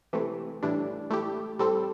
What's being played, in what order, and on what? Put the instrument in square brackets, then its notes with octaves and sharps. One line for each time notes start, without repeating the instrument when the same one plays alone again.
[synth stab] C3 E3 A3
A2 E3 G3 D4
A3 E4 G4
A2 G3 C4 A4